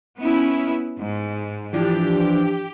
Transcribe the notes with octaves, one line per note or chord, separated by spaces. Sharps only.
B3 C#4 E4
G#2
E3 F3 D4 G4